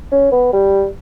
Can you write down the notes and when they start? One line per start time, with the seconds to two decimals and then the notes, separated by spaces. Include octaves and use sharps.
0.11 C#4
0.31 B3
0.53 G3